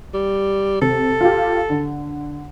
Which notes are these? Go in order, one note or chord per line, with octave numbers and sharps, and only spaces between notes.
G3
C3 A4
F4 G4
D3